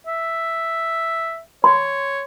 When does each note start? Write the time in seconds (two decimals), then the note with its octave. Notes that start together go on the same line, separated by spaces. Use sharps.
0.07 E5
1.64 C#5 C6